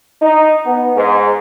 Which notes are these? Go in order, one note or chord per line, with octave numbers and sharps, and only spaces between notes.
D#4
B3
G#2